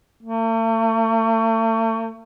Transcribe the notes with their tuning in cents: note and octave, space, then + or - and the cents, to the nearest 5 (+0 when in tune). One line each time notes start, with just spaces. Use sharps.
A3 +40